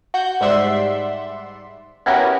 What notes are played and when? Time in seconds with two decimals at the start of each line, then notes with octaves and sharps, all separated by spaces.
0.14 F#4 F#5 G6
0.41 G#2 G3 D5 E5 F#5 C6
2.06 B3 C#4 E4 F#4 G4 A#4